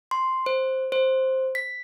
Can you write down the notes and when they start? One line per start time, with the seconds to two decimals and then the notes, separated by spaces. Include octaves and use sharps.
0.11 C6
0.46 C5
0.92 C5
1.55 B6